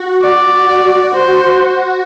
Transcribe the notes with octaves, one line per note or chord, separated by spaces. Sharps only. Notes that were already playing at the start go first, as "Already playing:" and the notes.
Already playing: F#4
D5
F#4
C5